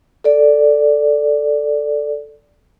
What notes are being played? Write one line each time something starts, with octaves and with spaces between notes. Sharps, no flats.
A4 D5